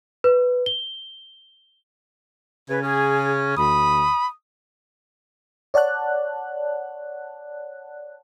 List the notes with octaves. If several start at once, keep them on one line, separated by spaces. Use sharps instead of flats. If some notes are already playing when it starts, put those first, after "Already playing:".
B4
G7
C#3 B4 G#5
C#4 G#4
D2 B5 D#6
C#5 D5 F#5 A5 F#6